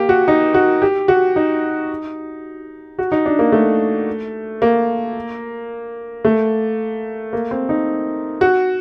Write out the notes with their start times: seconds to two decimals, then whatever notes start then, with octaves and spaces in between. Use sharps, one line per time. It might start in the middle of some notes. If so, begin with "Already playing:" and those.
Already playing: A#3 G4
0.09 F#4
0.28 D#4
0.54 F#4
0.82 G4
1.08 F#4
1.36 D#4
2.99 F#4
3.12 D#4
3.26 D4
3.39 A#3
3.52 A3
4.62 A#3
6.25 A3
7.33 A#3
7.51 C4
7.69 D#4
8.41 F#4